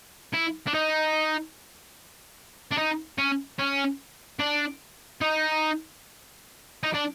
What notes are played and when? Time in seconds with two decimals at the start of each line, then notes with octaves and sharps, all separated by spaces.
0.34 E4
0.67 D4
0.74 D#4
2.71 D4
2.77 D#4
3.18 C#4
3.59 C#4
4.40 D4
5.21 D#4
6.83 D#4
6.94 D4